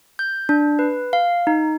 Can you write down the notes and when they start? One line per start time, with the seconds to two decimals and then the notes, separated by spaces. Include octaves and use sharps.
0.19 G6
0.49 D4
0.79 B4
1.13 F5
1.47 D#4